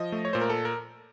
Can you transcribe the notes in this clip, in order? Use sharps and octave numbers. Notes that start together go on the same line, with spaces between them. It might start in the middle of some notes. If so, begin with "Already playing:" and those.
Already playing: F3 D#5
A3
C#5
A#2 C5
A#4
A4
A#4